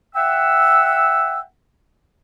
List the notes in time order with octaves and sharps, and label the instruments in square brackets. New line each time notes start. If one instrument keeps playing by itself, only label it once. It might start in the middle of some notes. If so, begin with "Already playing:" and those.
[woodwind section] E5 F#5 G5 E6